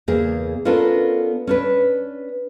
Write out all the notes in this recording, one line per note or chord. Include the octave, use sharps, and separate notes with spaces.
E2 C#3 A#3 G#4
B3 C#4 D4 F4 A4 A#4
C#4 D4 B4